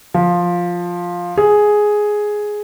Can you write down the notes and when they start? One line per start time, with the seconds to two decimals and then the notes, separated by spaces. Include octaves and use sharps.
0.14 F3
1.37 G#4